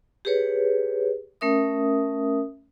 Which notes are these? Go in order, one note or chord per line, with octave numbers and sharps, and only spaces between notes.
G4 G#4 B4 C#5
A3 C#4 A#4 E5 D#6